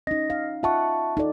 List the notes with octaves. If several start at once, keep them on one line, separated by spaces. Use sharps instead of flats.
C#4 D#4 D#5 A#6
F5
F4 D#5 E5 F#5 A5 C#6
D#4 A4 D5